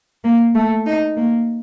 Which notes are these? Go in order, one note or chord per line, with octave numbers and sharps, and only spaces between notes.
A#3
A3
D#4
A#3